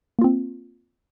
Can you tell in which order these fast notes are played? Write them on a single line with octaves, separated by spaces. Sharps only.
A#3 F4 C4